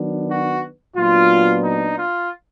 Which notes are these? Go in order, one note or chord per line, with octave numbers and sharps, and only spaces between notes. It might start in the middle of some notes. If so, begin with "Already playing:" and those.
Already playing: D#3 F#3 B3 D4
F#4
A#2 F#3 B3 D4 F4
D#4
F4